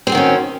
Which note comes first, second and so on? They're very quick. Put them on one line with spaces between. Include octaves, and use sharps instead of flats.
C4 G#4 F#4 D#3 C#4